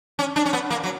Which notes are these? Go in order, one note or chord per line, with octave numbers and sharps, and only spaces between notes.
C#4
D4
C#4
B3
A#3
F#3